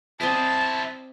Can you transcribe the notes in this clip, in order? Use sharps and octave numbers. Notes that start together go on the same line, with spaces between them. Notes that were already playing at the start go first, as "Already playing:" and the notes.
C4 E4 C5 D5 D#5 A5